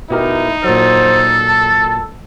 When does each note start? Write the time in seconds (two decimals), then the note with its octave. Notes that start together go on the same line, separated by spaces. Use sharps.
0.10 B2 D#4 E4 G4 A#4
0.64 A#2 F#3 A4 C5
1.48 A5